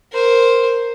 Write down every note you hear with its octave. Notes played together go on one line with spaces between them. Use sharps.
A#4 C5